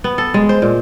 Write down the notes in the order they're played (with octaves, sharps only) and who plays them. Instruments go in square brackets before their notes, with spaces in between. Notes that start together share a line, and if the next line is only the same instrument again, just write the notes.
[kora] B3
A4
G#3
C5
A#2